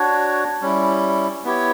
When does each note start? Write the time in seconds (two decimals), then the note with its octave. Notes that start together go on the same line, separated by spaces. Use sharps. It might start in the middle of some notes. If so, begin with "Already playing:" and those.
Already playing: D4 F#4 C#5
0.61 G3 C#4 E4
1.45 B3 E4 G4 C#5